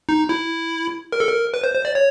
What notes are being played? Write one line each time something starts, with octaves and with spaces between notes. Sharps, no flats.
D#4
E4
A#4
A4
A#4
B4
C5
C5
D5
C#5